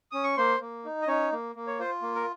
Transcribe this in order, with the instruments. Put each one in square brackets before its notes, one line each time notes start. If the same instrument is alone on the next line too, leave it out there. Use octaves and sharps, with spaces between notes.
[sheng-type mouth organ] C#4 D#6
C#6
A#3 C5 C6
A#3
D#4
D#5
C#4 D#4 C#5
A#3
A#3
C#5
F4 C5
A#3
A#4